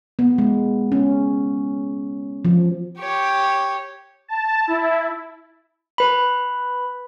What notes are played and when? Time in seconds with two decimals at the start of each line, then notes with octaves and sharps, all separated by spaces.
0.19 B3
0.38 G#3
0.92 C#4
2.45 F3
2.99 G4 C#5
4.28 A5
4.68 E4
5.98 B4 B5